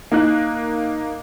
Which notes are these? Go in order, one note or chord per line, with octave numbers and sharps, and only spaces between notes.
A#3 D#4 F#6